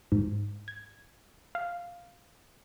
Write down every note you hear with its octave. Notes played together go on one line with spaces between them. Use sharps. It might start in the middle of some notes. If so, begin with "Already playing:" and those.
G#2
G#6
F5